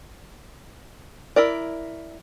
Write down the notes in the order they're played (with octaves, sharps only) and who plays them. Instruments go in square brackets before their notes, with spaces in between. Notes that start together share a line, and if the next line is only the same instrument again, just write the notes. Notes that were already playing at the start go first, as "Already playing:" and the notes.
[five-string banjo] E4 A#4 D5